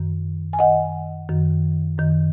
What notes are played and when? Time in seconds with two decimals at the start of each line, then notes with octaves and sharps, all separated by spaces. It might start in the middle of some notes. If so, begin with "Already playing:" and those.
Already playing: F#2 D#3
0.53 G#5
0.59 F#2 D#3 D#5 F#5
1.29 F#2 D#3
1.98 F#2 D#3